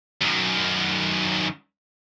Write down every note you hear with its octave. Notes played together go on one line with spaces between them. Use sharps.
F#2 D#3